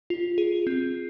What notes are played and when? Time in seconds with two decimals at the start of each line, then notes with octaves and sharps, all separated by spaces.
0.10 F4
0.38 G#4
0.67 C4